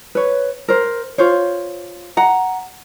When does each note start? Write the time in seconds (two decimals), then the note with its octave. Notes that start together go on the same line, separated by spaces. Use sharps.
0.15 B4 C#5
0.68 A#4 C5
1.18 F4 C5 C#5
2.17 F#5 A#5